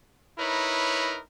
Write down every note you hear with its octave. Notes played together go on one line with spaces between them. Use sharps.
D#4 E4 A#4 B4 C#5